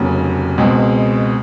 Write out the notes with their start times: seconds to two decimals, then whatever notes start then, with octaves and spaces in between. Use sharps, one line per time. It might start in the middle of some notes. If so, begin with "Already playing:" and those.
Already playing: F1 D#2 C#3 F#3
0.58 C#2 B2 G#3 C4